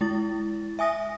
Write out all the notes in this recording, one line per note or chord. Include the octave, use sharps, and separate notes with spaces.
G#3 E4 A6
E5 G#5 D#6 A#6